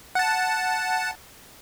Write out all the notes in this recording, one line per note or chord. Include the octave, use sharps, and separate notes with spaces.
F#5 A5